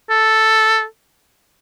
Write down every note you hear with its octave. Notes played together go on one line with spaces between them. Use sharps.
A4